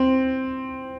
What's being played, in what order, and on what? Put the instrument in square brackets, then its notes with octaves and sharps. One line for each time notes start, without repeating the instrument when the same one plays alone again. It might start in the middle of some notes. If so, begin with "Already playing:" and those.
Already playing: [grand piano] C4